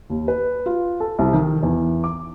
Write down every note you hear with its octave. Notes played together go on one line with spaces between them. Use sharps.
D#2
B4
F4
A4
C2
D#3
E2
D6